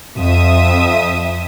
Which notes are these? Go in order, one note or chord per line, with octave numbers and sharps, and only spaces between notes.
F2 E5 D#6